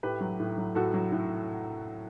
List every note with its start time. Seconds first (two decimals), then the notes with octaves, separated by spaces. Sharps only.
0.03 A2 G4 B4
0.21 F#3
0.40 A2
0.58 F#3
0.75 A2 F#4 A4
0.94 F#3
1.12 A2